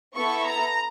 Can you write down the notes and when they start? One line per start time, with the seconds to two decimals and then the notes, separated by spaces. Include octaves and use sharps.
0.15 B3 E4 A4 C#6
0.47 A#5